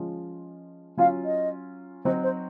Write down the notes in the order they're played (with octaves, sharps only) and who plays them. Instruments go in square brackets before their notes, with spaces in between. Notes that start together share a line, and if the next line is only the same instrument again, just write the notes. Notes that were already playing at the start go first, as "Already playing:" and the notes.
Already playing: [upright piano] F3 G#3 C#4 F4
[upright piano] F#3 C#4 F4 [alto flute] F5
[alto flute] D#5
[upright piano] F#3 C4 D#4 F#4 [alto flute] C5
[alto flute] C5